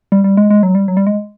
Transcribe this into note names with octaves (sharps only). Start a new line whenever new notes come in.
G3
G3
G#3
G#3
F#3
G3
F#3
G3
G#3